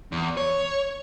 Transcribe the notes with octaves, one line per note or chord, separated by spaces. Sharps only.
E2
C#5